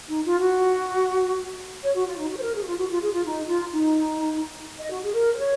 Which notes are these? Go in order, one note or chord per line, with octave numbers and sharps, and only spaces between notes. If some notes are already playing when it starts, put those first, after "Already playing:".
D#4
F4
F#4
C#5
F#4
F4
D#4
F#4
C5
A#4
G#4
F#4
F4
F#4
F4
G#4
F4
D#4
F4
D#4
D#5
F#4
G#4
A#4
C5
C#5